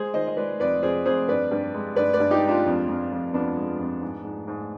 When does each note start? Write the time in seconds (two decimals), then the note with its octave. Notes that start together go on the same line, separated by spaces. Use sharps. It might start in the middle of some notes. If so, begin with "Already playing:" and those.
Already playing: G#3 G#4 C5
0.14 D#3 C5 D#5
0.27 D#5
0.37 G#3 B4 D5
0.60 F2 B4 D5
0.83 F2 G#4 C5
1.05 F2 G#4 C5
1.28 G2 B4 D5
1.51 G2
1.74 G#3
1.96 G2 B4 D5
2.13 B4 D5
2.20 G2
2.30 D#4 G4
2.42 G#3
2.48 D4 F4
2.66 F2
2.88 F2
3.11 F2
3.33 F2 B3 D4
3.57 G#3
3.79 F2
4.01 G#2
4.24 G#2
4.48 G#2